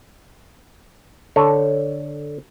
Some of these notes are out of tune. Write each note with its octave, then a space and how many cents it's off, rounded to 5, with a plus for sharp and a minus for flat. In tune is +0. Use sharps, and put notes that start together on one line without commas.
D3 +0 A4 +0 C#5 +0